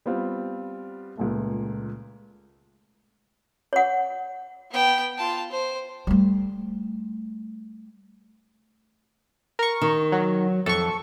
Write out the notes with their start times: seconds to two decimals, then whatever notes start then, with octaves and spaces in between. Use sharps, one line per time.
0.06 G3 B3 C4 F4
1.17 C#2 A#2 A3
3.73 C#5 F#5
4.71 B3 G5
5.18 F4 A5
5.51 C5
6.07 G3 A3
9.59 A#4 C#6
9.82 D#3
10.12 F#3
10.66 F2 A4 C#6